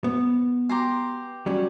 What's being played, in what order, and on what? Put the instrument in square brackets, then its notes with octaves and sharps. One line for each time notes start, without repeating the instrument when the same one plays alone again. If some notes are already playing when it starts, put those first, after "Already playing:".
[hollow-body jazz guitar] B3
[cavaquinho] G4 A#5 C6
[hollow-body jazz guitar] F#3 G3 C#4